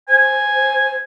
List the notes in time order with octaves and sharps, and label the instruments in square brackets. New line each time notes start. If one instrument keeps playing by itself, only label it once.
[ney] C5 [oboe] G#5